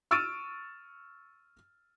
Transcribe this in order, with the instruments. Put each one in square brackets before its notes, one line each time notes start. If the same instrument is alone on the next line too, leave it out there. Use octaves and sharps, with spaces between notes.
[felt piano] C#6 E6 F6 A6 D7 D#7